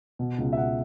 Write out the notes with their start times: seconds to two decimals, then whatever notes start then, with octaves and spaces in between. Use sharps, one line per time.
0.19 B2
0.38 C#2
0.53 E5
0.57 B2 F#5